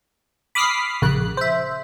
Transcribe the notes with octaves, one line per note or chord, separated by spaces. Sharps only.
B5 D6 D#6 F6 B6 C7
A#1 C#3 F#6
C5 E5